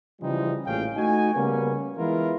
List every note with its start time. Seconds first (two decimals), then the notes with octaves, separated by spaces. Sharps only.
0.21 C#3 E3 F3 G3 G#3 D#4
0.64 A1 A#2 G#3 C#4 F5 G5
0.96 A3 D#4 F#4 G#5
1.34 C#3 G3 A#3 B3 C#4
1.97 E3 G#3 B3 E4 F4 A#4